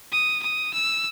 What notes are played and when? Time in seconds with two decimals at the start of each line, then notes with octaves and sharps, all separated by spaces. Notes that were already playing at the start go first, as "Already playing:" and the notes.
0.12 D#6
0.43 D#6
0.73 E6